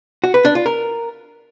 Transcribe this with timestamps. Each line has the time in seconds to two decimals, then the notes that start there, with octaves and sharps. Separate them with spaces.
0.24 F#4
0.34 B4
0.45 D4
0.55 F4
0.66 A#4